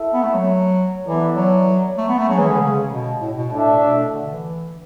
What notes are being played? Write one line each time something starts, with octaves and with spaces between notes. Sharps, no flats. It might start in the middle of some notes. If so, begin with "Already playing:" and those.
Already playing: E4 A4 E5
B3
A3
F#3
E3 B3 E4 A4 D5
F#3
A3
B3
A3
F#3 G#3 C#4 G#4
E3
D3
C#3
B2
A2
B2
A2 A3 D4 A4 E5
B2
D3
E3